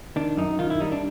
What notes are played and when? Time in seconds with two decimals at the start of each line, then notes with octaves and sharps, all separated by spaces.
0.16 D#3 D4
0.37 F#2 D#4
0.59 D#3 F4
0.70 E4
0.81 G3 D#4
0.92 D4